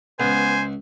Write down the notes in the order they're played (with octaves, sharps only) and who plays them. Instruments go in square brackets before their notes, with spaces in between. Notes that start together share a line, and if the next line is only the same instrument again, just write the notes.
[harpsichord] C#2 [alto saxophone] B3 [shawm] C5 [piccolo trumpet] G#5